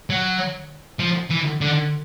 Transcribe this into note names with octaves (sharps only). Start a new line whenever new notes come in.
F#3
F3
E3
D3